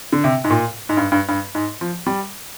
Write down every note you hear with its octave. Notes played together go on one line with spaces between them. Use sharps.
D3
C3
G#2
A#2
G#2
G2
G2
G2
G#2
F3
G3